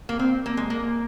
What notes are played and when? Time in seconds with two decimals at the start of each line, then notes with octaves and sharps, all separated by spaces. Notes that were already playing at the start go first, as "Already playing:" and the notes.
0.09 A#3
0.19 C4
0.46 A#3
0.57 G#3
0.70 A#3